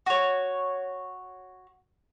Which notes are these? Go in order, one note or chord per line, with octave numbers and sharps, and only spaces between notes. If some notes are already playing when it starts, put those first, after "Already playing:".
F#4 C#5